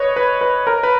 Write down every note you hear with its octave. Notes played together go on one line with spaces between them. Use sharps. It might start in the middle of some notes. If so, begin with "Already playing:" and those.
Already playing: B4 C#5 D#5
B4
B4
A#4
B4